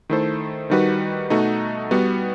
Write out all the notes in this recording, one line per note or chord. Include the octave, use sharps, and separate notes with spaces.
D#3 A3 E4 A4 C5
D#3 G3 D#4 F#4 B4
B2 A3 D#4 F#4
G3 B3 F#4